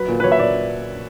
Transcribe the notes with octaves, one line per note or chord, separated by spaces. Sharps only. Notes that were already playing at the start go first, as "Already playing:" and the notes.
Already playing: F#3 B4
A#2
B4
F#3 C#5
E5
A#2 D5